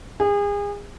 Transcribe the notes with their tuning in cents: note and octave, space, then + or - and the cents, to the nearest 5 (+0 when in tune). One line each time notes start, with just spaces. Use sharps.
G#4 -35